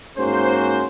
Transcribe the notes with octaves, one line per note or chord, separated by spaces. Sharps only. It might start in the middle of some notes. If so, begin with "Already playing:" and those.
G#2 A#3 C#4 F#4 G#4 C5